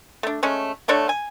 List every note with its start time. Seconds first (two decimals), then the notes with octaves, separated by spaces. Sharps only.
0.23 A3 D4
0.43 G#3 A3 C#4
0.88 D3 A3 D4 C#5
1.09 G#5